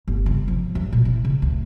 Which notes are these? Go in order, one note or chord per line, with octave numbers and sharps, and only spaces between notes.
G1
C#3
F3
F#2
A#2
E4
C#3
D2